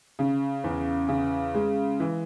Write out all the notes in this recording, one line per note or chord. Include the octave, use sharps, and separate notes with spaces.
C#3
E2
C#3
G#3
E3